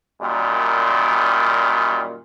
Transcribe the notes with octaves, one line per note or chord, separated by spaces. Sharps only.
F#2 A#2 D#3 G3